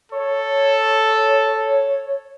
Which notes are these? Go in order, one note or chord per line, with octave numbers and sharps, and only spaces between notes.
A4 C#5